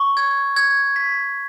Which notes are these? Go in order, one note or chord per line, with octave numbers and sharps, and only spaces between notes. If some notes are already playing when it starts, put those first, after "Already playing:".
Already playing: C#6
G#6
G#6
B6